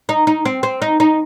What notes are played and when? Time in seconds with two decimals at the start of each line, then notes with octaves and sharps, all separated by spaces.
0.09 D#4
0.27 D#4
0.45 C4
0.63 C4
0.82 D#4
1.00 D#4